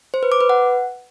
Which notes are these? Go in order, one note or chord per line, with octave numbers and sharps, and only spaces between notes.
C5
B4
D6
B4
F#5